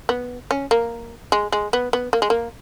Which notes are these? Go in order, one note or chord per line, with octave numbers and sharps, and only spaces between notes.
B3
C#4
A#3
G#3
G#3
B3
B3
A#3
G#3
A#3